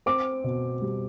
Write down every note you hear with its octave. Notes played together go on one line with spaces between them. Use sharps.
C4 D6
B2
G3